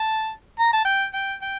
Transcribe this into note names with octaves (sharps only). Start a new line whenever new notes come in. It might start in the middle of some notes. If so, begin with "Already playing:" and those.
Already playing: A5
A#5
A5
G5
G5
G5